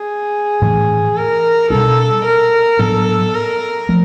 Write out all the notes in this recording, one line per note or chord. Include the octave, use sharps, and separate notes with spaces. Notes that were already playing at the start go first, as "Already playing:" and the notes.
Already playing: G#4
A2 E3 A3 D4
A#4
B2 G3 A#3 D4 A4
A#4
A2 F#3 B3 D4 A4
A#4
F3 A3